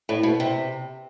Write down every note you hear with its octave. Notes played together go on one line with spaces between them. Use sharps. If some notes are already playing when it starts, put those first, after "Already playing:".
A2
B2
C3